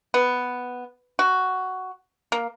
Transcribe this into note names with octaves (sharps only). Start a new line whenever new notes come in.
B3
F#4
A#3